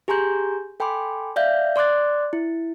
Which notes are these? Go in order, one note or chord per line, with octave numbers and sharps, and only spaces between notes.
G4 G#4 G#5 A#5 C6 G6
A4 G5 G#5 B5 C6 D6
D5 E5 F5 G6
D5 C6 D6 F#6 A6
E4